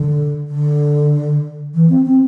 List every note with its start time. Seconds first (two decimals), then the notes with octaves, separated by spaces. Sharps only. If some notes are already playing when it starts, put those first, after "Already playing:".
Already playing: D3
0.48 D3
1.74 E3
1.90 C4
2.05 C4